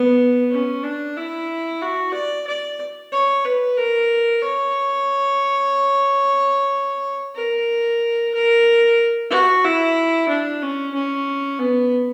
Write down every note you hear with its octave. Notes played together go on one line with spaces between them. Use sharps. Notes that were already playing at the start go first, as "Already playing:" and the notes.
Already playing: B3
C#4
D4
E4
F#4
D5
D5
C#5
B4
A#4
C#5
A#4
A#4
F#4
E4
D4
C#4
C#4
B3